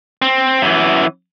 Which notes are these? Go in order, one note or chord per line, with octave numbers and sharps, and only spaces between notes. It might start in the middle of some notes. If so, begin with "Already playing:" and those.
C4
F#2 E3